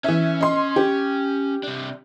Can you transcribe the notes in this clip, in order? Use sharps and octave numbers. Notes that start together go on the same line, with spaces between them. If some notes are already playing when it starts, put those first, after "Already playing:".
E3 C#4 E5
D#5 C6
G4
C3 D4